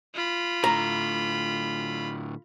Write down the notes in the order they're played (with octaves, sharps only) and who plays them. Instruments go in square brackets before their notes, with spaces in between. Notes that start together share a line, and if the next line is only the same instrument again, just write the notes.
[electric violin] F4 B5
[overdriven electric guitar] A2 D3 [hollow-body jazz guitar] A#5